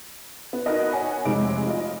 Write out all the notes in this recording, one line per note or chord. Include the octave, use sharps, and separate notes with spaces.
B3
D#4 F#4 A#4 B4 D#5
C#5 F#5 G#5 B5
F1 C3 G#3 D#4 D7
F4 D#5